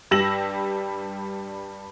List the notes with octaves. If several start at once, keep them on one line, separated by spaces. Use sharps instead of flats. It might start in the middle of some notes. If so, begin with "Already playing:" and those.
G2 G3 E6 A#6 E7 F#7